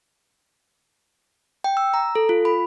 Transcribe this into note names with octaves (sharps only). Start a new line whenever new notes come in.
G5
E6
A#5
A4
F4
B5